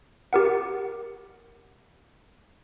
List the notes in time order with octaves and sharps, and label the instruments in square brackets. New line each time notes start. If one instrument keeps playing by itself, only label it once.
[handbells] G4 A#4 F#5